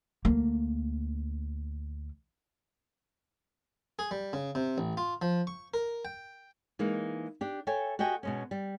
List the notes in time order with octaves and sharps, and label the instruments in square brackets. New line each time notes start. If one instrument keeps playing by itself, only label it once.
[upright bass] D2 A#3
[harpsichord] G#4
G3
C#3
C3
A1
F4
F3
C#6
A#4
G5
[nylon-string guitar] E3 G#3 A#3 D#4
D4 G4
A4 C#5 E5 G5 G#5
F#4 G4 D#5 G5 G#5
B2 G#3 C#4
G3